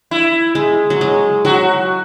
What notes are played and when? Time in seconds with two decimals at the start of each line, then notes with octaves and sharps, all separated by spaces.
0.11 E4
0.55 G#3
0.90 F#3
1.01 G#3
1.45 F#3 F#4